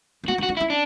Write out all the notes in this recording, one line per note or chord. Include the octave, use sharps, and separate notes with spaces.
C#4
B3 F#4
C#4 F#4
D4
E4
C#4
D4